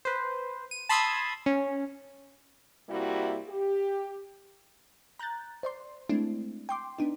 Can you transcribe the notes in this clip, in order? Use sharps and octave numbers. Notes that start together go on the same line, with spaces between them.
B4 C5
D#7
A5 B5 C6 D#6 E6 G#6
C#4
C3 G3 A#3 E4 F#4
G4
A#5 F#6 G6 A6
C5 D5 C6
G#3 A3 C4 D4 E4
G5 C6 D6
B3 D4 D#4